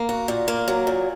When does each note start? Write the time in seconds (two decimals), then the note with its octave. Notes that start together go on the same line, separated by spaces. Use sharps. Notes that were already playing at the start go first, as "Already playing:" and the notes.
Already playing: A#3
0.09 F#4
0.28 A#2
0.48 A#3
0.68 F#3
0.87 A#2